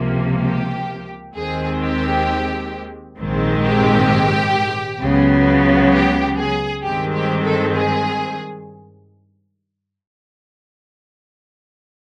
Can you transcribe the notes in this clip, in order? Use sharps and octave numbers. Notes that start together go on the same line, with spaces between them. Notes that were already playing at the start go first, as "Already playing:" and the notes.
Already playing: C#2 C3 F3 A#3
G4
D#2 D#3 G#3 C4 G#4
G4
A#1 G#2 D#3 G#3 C4
G4
C#2 C#3 F#3 B3
G4
G#4
G2 D#3 G#3 C4 G4
G4
A4
G#4